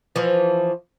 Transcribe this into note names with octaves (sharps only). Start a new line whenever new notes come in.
E3 F3